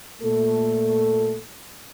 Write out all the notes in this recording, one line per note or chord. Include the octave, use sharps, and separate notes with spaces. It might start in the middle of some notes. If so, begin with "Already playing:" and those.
A#2 A3 A4